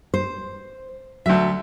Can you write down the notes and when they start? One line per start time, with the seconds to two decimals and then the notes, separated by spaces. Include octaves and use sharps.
0.14 C5
1.26 D2 F#3 E5